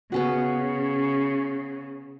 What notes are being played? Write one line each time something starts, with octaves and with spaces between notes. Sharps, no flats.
C#3 B3 C#4 F#4